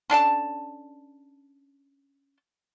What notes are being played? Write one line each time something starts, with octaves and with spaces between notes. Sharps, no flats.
C#4 D4 A4 A5